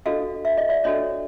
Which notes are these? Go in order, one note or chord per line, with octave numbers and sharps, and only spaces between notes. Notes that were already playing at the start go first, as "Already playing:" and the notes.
D4 F#4 A4 D#5 F5
E5
D#5
D5 E5
D4 F#4 A4 C#5 D#5